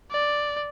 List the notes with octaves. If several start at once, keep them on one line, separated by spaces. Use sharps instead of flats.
D5